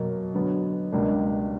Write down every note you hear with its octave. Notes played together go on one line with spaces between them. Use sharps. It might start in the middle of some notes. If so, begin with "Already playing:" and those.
Already playing: B2 F#3 A#3
D3 F#3 B3
C#2 B2 G3 A#3 D4